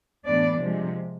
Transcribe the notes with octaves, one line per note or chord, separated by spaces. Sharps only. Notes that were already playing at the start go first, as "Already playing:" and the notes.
A2 E3 B3 D4 D5
C3 F3 G#3